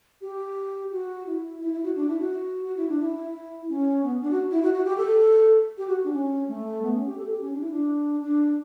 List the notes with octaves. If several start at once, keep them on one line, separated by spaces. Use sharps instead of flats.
G4
F#4
E4
E4
E4
F#4
D4
E4
F#4
F#4
E4
D4
E4
C#4
B3
D4
F#4
E4
F#4
F#4
G4
A4
G4
F#4
D4
C#4
A3
B3
C#4
G4
A4
G4
C#4
D4
E4
D4
D4